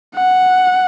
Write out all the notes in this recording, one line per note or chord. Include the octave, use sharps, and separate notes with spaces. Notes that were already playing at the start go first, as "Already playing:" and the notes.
F#5